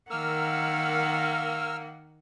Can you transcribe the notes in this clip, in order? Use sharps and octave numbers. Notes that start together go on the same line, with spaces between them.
D#3 A#3 F#5 E6 F6